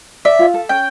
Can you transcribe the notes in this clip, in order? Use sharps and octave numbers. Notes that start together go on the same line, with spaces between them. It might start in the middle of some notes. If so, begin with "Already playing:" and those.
D5 E5
F4
A4
C#4 G5